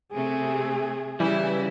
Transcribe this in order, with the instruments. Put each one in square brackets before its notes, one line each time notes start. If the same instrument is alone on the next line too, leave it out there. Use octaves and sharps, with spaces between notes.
[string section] C3 A3 [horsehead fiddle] G#4
[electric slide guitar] C#3 G3 [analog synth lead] E3 [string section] E4